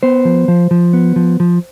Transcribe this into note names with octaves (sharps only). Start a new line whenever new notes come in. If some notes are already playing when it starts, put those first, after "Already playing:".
B3 C5
F3
F3
F3
B3
F3
F3